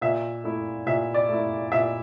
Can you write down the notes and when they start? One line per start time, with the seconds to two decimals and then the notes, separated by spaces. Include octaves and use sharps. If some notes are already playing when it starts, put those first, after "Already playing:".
0.01 A#2 E5
0.44 A3 E4
0.86 A#2 E5
1.14 D5
1.29 A3 E4
1.72 A#2 E5